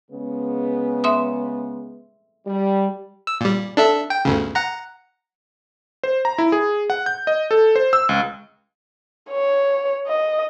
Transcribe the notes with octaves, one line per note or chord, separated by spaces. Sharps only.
C#3 G#3 B3
E5 C6 D#6
G3
E6
A#2 G3
D4 A4 E5
G5
G1 D2 C#3
F#5 A#5
C5
A#5
E4
G#4
F#5
G6
D#5
A4
C5
E6
C#2
C#5
D#5